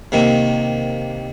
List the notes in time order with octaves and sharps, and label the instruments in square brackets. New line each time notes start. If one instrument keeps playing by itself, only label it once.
[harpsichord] C3 D#3 A#3